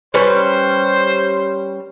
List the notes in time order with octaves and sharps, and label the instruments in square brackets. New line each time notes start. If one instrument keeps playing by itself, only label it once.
[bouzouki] G3 C#4 B4 [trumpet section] C5